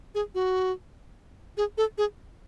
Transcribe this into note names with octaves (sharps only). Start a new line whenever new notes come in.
G#4
F#4
G#4
A4
G#4